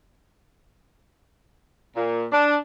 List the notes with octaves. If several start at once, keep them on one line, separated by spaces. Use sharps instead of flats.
A#2
D4